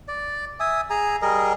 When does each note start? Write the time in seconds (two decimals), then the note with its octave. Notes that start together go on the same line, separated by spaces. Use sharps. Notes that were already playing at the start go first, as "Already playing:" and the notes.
0.08 D5
0.60 E5 G#5 D#6
0.90 G#4 G#5 A#5
1.22 G3 G#4 A#4 D#5